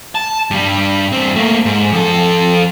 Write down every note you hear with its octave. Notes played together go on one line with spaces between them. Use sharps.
A5
G2 G3
G2 C4
A3 A#3
G#2
F2 A4